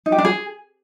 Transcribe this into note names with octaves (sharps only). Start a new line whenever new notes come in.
D#4
G4
D4
G#4